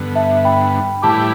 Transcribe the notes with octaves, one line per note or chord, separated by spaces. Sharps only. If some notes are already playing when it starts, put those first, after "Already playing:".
Already playing: G2 D3 B3
E5 A5
G5 B5
A2 E3 G3 E4 G4 A5 D6